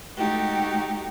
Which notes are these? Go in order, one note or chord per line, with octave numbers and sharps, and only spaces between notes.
G#3 A3 D#4 F#4 G4